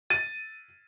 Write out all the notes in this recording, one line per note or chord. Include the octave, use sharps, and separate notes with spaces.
A6 D#7